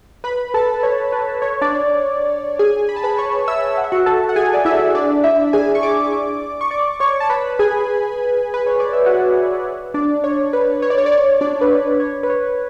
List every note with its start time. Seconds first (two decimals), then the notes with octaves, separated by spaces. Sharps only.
0.24 B4 B5
0.54 A4 A5
0.74 B4
0.83 C#5
1.12 B4
1.42 C#5
1.61 D4 D5
2.59 G#4 G#5
2.89 B5
2.96 A5
3.04 B4 B5
3.18 C#5 C#6
3.48 E5 E6
3.77 F#5
3.84 E5
3.92 F#4 F#5
4.06 A4 A5
4.29 F#5
4.36 G#4 G#5
4.54 D5
4.65 E4 E5
4.95 D4 D5
5.24 E4 E5
5.53 G#4 G#5
5.75 C#6
5.83 D5 D6
6.61 C#6
6.71 D5 D6
7.00 C#5 C#6
7.20 A5
7.30 B4 B5
7.59 G#4 G#5
8.54 B4
8.67 C#5
8.80 D5
8.93 E5
9.06 F#4 F#5
9.94 D4 D5
10.24 C#5
10.53 B4
10.82 C#5
10.90 D5
10.98 C#5
11.06 D5
11.12 C#5
11.41 D4 D5
11.61 B4
11.71 C#5
12.00 C#5
12.23 B4
12.30 C#5